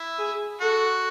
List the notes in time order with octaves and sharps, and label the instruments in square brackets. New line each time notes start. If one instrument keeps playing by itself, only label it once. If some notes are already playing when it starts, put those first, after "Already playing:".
Already playing: [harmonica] E4
[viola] G#4
[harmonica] F#4 [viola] A4